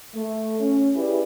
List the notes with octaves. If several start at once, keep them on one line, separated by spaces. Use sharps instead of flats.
A3
C#4
E4 G4 G#4 B4 D5